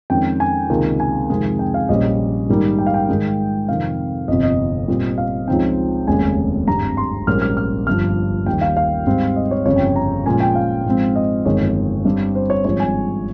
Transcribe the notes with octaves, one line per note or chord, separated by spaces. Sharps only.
F2 D#3 G#3 C#4 G5
G#5
C#2 C3 D#3 A#3 D#4
G#5
F2 C3 D#3 G#3
G5
F5
A#1 A#2 G3 C#4 D#5
G#2 D#3 G3 A#3 D#4
G5
F5
G5
G#2 D#3 G#3
F2 C3 D#3 F5
G1 F2 C3 D#5
D#5
A#2 G3 C4
F5
C#2 C#3 F3 C4 D#4 G5
F1 D#2 C#3 G#3 C#4 G#5
G#1 G2 G3 A#5
C6
A#1 G#2 G3 A#3 C#4 F6
F6
F6
G1 G2 F3 F6
D#2 D#3 G3 G5
F5
F5
G#2 G3 C4
D#5
C#5
G1 F2 C#3 G3 C#5
G5
G5
A#5
A#2 F3 G#3 C#4 G#5
G5
F5
G#2 F3 G#3 C4
D#5
G1 F2 D#3 G#3 C#5
G2 G3 C4
C5
C#5
G#1 G2 F3 G#3 C#5
G#5